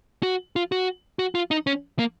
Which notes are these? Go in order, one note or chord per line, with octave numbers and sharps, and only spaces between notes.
F#4
F4
F#4
F#4
F4
D#4
C#4
A#3